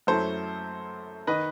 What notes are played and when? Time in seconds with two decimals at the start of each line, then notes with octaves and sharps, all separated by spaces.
0.07 F#2 F#3 A3 E4 A4 C5
1.27 D#3 B4 D#5